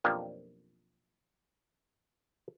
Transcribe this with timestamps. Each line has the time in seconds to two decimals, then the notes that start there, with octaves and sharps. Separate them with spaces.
0.04 B1 F2 F3 A#3 D4 G4